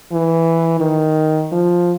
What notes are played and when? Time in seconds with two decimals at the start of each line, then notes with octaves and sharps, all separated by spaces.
0.12 E3
0.80 D#3
1.52 F3